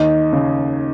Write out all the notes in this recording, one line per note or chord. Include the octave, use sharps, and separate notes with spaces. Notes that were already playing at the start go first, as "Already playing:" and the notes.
Already playing: D#2 D#4
C#3